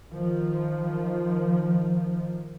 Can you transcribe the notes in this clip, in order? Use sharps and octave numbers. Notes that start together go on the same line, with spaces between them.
D#3 F3